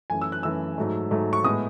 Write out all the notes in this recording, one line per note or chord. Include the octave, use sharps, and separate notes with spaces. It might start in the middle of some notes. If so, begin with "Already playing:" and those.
F#2 E3 A3 G#5
E6
F#6
F#2 E3 A3 E6
G#2 F#3 A3
G#2 F#3 A3
C#6
A2 G#3 B3 D#6